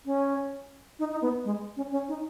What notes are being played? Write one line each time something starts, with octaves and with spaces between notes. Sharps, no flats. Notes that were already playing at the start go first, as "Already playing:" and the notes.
C#4
D#4
D#4
B3
G#3
C#4
C#4
D#4